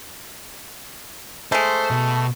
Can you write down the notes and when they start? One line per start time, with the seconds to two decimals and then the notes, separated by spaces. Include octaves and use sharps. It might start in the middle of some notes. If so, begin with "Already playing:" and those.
1.52 G#3 A3 C5
1.90 B2